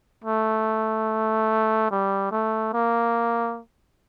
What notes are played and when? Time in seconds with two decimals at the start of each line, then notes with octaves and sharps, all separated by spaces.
0.24 A3
1.91 G3
2.32 A3
2.73 A#3